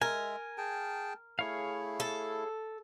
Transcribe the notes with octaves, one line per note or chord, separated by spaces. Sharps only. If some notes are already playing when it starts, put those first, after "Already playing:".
G#3 A#4 E5 G#5
G#4 G5 A5
A3 E4 G#4 C#5 F5
A4